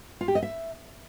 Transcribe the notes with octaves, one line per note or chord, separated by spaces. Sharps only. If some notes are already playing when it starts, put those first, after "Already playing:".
F4
G4
D#5
E5